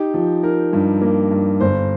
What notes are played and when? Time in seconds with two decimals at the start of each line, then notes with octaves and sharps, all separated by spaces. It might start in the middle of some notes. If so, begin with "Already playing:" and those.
Already playing: D#4 G4
0.14 F3
0.43 D#4 A#4
0.73 G2
1.01 A#3
1.31 G2
1.60 G1 C5